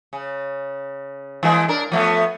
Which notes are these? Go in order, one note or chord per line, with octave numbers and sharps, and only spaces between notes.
C#3
E3 G#3 A#3
D4 A#4
F3 A3 B3